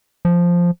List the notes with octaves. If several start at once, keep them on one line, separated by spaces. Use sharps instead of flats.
F3